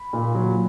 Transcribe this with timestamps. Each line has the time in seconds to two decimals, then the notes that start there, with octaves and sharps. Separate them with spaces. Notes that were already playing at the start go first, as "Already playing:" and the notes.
Already playing: B5
0.13 A#2
0.35 F#3